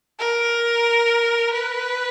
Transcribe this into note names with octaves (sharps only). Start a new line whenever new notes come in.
A#4
B4